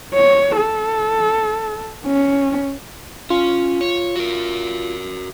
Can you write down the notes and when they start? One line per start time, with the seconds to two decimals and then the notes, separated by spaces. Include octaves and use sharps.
0.14 C#5
0.57 A4
2.06 C#4
3.30 C#4 F4
3.81 C#5
4.16 F#4 A#4